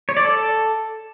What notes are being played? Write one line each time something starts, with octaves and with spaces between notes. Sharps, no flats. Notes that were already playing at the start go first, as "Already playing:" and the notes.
C#5
D5
A4